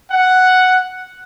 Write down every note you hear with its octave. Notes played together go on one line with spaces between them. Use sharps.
F#5